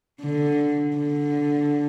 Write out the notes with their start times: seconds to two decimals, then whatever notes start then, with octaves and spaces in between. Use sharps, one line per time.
0.21 D3
0.96 D3